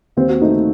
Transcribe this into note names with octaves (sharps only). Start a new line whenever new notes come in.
D#2 C4
F#4
D#3 A3 D#4